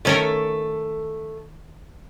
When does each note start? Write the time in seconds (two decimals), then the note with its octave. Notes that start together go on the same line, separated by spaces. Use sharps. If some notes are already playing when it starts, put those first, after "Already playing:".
0.05 D#3 A3 C#4 A4 A#4